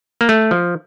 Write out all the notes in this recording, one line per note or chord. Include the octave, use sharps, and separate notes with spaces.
A#3
A3
F3